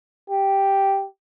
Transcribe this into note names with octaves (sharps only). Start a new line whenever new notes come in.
G4